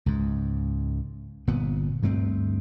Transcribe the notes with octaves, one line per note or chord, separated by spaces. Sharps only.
C#2 G#2
G1 A#2 B3
D2 G2 A3 C4